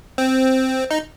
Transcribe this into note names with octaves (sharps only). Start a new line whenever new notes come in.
C4
D#4